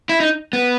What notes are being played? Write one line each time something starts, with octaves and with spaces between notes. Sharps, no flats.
E4
D#4
B3